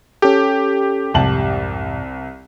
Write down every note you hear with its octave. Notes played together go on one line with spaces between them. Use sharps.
C#4 G4 A4
C2 F2 G#2 C3 A5 F#7